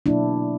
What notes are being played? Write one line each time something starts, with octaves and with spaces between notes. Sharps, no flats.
B2 F#3 A#3 D4 E4